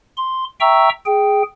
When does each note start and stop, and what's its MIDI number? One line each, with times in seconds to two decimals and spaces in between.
0.17 0.44 84
0.60 0.89 76
0.60 0.89 79
0.60 0.89 82
0.60 0.89 85
0.60 0.89 88
1.06 1.43 68
1.06 1.43 79